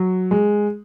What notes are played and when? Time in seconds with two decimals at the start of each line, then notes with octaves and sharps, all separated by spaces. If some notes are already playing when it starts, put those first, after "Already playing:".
Already playing: F#3
0.31 G#3